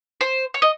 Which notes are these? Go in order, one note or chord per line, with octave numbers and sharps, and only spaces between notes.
C5
C#5
D#5